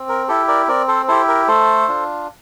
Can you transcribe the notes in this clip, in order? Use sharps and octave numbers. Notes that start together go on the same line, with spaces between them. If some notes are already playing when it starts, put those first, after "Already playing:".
Already playing: C4
A#4
E4 G4 A4
A#4 D5
C4 A#4 D5
A4 C5
E4 G4 A4 C5
A#4
A3 A4 C5
D4 F4